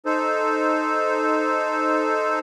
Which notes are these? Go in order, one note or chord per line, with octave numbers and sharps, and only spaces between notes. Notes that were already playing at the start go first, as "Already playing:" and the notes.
D#4 A4 C5